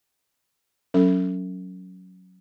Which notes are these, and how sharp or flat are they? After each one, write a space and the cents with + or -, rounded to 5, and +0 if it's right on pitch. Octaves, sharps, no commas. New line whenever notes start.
F#3 +0 C#4 +0 A4 +30